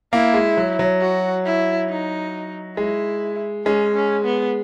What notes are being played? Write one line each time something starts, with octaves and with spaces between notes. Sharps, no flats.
A#3 E4
G#3
F#3
F#3
F#4
E4
D#4
G#3 E4
G#3 C#4
C#4
B3